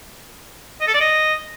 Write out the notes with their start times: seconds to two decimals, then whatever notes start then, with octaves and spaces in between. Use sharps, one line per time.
0.81 D#5
0.87 A4
0.94 D5
1.00 D#5